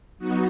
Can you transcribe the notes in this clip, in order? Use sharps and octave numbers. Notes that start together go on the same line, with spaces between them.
F#3 B3 D#4 F#4